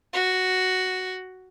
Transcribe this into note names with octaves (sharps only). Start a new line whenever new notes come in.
F#4